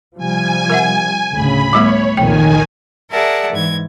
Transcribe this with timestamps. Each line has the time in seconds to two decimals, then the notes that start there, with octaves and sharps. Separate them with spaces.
0.18 C3 F3 G3 G#5
0.70 A#4 E5 F#5
1.33 D2 A2 C#3 B5
1.73 E3 G3 A3 B3 C#5
2.17 C2 F2 A#2 D#3 G5 G#5
3.11 G#4 A#4 D5 E5 F#5 A5
3.51 G#2 E3 G#6